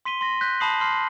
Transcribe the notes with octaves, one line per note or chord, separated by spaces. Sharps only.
C6 B6 D#7 G7
C6 A#6
F#6 G6 B6
A5 B5 D#6 C7 F#7
C6 F6 C7